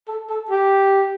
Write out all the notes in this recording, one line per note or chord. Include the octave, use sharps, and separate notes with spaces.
A4
A4
G4